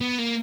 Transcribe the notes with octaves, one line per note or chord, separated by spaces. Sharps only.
B3
A#3